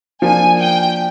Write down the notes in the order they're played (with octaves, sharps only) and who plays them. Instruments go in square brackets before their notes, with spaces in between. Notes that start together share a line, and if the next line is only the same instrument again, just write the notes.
[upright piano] F3 A#3 D4 [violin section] G#5
[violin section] G5